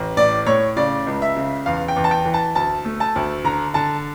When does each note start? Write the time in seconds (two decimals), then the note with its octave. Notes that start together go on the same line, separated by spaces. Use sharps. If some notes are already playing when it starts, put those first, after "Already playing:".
Already playing: A1
0.17 A2 D5
0.46 A2 C#5
0.76 C#3 D5
1.07 C#2
1.22 E5
1.36 C#3
1.66 E2 F5
1.88 G5
1.96 E2
2.04 A5
2.11 G5
2.25 E3
2.34 A5
2.55 D2 A5
2.85 A3
3.00 A5
3.16 D2
3.44 D3 A#5
3.74 D3 A5